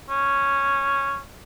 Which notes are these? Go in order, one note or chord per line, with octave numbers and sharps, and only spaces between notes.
C#4